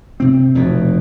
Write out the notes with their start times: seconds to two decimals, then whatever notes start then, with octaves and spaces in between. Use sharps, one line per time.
0.20 C3 C4
0.55 F1 E2 B2